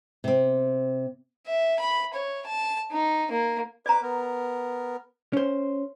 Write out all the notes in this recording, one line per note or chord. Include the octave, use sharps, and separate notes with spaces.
C3 C4
E5
B5
C#5
A5
D#4
A#3
B4 D5 A#5 D6
B3 A#4
C#4 C5